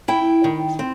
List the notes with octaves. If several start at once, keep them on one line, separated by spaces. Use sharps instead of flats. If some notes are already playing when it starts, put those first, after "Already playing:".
E4 G5
D#3
C4